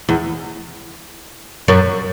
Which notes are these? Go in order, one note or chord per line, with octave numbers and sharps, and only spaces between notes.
E2
F#2